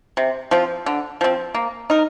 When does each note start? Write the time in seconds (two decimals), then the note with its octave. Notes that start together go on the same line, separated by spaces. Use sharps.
0.17 C3
0.51 F3 C4 F4
0.86 D3
1.21 F3 C4
1.55 A#3
1.90 D#4 A#4